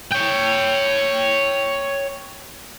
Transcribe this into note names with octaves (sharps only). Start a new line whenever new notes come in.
C#5 G5